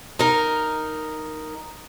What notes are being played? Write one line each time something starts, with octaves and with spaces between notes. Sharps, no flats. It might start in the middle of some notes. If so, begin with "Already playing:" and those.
D#4 A#4